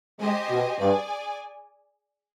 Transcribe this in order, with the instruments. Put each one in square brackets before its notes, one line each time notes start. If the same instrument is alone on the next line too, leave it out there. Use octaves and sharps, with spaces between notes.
[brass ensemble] G#3 [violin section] G4 C5 D#5 G#5
[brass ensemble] B2
[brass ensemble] G2 [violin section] G#4 D5 G#5